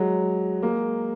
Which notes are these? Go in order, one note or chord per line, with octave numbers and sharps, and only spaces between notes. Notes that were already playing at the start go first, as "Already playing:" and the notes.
Already playing: F#3 G#3
G#3 A#3